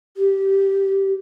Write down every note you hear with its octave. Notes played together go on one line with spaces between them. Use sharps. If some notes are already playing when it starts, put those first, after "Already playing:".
G4